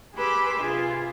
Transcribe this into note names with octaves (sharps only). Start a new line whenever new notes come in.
G4 G#4 B4 C6 D6 E6
C3 F4 G#4